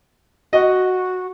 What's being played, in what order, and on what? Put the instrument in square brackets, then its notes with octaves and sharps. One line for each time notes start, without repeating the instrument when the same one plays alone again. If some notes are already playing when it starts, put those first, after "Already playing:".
[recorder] F#4 [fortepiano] D#5